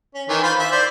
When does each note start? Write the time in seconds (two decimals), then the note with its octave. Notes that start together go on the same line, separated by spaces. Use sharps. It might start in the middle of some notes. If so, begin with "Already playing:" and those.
0.14 C#4
0.29 D#3 E3
0.43 F4 C5 B5
0.59 E5
0.72 C5 D5